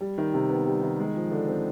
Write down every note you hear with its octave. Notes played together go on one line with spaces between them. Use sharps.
G3
D#3
C3
B3
G3
D#3
G#3
F3
D3
C4